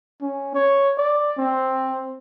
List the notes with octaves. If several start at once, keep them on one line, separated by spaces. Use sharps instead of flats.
C#4
C#5
D5
C4